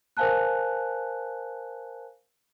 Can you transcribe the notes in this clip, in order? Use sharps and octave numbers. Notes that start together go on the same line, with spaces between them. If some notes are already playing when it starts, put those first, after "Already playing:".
A#4 C5 F5 G#5 A5 F#6